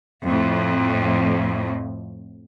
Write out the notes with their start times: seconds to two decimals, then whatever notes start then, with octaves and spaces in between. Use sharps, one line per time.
0.25 F2 A2